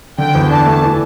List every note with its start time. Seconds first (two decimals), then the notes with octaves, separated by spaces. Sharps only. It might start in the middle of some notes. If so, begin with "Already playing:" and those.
0.18 D3 G5
0.35 E2
0.50 D4 A5
0.66 A3
0.82 E3